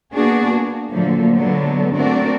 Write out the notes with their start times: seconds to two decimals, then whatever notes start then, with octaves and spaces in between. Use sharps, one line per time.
0.11 A#3 B3 D4 F#4 G#4
0.47 A#3
0.90 A#2 D3 F3 F#3 A3 A#3
1.36 D3 F#3 G#3 A3 B3
1.95 A3 C4 D4 F#4 A#4 D5